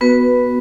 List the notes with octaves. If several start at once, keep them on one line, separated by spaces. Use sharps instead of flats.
B3 F#4 B4